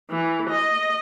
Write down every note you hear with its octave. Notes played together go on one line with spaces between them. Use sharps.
E3
D#5